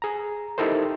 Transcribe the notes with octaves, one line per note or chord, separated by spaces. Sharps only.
G#4 A#5
D#4 E4 G4 A4 A#4 C5